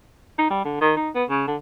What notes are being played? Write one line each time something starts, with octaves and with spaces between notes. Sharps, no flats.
D#4
G3
D3
D#3
D#4
B3
C#3
D3